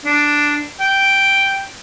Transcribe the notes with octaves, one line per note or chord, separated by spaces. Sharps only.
D4
G5